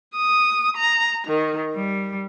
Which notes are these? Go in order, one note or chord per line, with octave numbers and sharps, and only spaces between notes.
D#6
A#5
D#3
G3